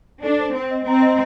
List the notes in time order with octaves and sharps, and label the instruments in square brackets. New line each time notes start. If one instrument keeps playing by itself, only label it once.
[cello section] D4 [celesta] A4
[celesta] C5
[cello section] C4 [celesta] C5
[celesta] D#5
[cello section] C4 [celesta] A#5
[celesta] D#5